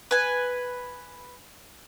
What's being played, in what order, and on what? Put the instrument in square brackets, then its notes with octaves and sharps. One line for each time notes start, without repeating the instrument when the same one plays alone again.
[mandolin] B4 G#5